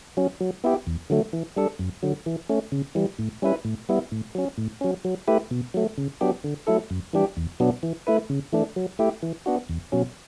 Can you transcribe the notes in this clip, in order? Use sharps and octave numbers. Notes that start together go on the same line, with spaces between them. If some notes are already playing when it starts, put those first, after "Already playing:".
F#3 C#4
F#3
B3 E4 G4
E2
D3 F#3 A3
E3
G3 D4 A4
F#2
D3 F#3
E3
A3 C#4
C#3
E3 G3
A2
G3 C#4 E4 B4
A2
G3 B3 E4
A2
F#3 C#4
A2
F#3 C#4
F#3
A3 E4 G4 B4
B2
F#3 A3
C#3
F#3 B3 D4 G4
D3
F#3 A3 E4 A4
F#2
E3 G3 D4 G4
E2
B2 F#3 B3 D4
E3
A3 E4 B4
C#3
E3 A3 D4
F#3
A3 E4 G4
E3
B3 D4 F#4
E2
B2 F#3 C#4